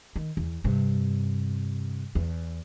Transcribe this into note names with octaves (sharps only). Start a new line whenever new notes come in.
D#3
E2
G2 C3
E2